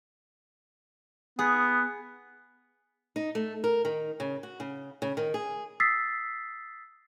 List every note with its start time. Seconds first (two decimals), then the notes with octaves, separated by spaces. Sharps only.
1.39 B3 G#4
3.16 D#4
3.35 A3
3.64 A#4
3.85 D#3
4.20 C#3
4.43 F#4
4.60 C#3
5.02 C#3
5.17 D#3
5.34 G#4
5.80 D#6 E6 A6 B6 C7